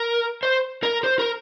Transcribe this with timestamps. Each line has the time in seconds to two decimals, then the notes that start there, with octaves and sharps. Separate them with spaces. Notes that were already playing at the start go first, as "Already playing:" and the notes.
Already playing: A#4
0.43 C5
0.83 A#4
1.04 C5
1.19 A#4